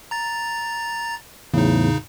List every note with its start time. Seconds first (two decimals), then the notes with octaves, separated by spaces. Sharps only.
0.11 A#5 A6
1.54 E2 A2 C#3 D#4